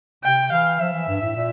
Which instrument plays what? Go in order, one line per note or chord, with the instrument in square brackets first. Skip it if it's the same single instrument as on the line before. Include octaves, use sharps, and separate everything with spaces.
[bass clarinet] C3 [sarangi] G5
[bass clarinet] E3 [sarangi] F5
[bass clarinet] F3 [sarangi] E5
[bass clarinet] E3
G2
A2
A#2